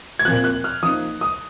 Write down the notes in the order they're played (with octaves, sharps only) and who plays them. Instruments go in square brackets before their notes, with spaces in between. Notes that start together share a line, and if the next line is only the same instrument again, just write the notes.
[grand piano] G#6
A#2 F3 C4 F4 F#6
F#6
F6
F3 A#3 D#4 D#6
D#6